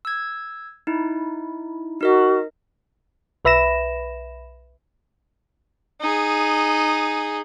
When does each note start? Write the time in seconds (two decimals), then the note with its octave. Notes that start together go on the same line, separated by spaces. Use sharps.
0.05 E6 G#6
0.87 D#4 E4
2.01 D#4 F#4 A#4 D#5
3.45 B1 B4 E5 B5 A#6 E7
6.01 D#4 G#4